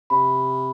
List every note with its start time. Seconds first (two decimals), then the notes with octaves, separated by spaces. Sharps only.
0.10 C3 B5